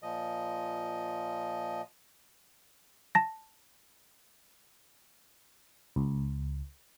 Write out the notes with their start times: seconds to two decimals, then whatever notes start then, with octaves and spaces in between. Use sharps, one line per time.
0.03 A#2 F3 D#5
3.15 A5 A#6
5.96 C#2